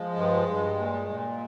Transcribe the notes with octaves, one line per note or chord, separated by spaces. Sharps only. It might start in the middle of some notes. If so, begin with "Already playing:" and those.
Already playing: F3 G#3
G2
G2
A#2
A#2